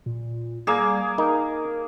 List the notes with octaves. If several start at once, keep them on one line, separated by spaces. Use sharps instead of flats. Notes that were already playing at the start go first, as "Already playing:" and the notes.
A#2
G3 A#3 G#4
D#4 A#4